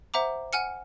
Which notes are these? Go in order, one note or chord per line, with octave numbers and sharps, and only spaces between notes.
C5 E5 F#5 A#5 D6
F#5 G#5 F6 C#7